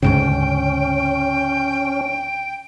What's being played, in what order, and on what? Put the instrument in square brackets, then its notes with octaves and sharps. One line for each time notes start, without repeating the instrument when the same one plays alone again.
[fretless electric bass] D2 G#2 C#3 [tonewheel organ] C#4 [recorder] G5